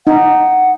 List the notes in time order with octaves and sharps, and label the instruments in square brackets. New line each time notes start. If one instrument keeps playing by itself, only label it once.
[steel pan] D#4 [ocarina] F#5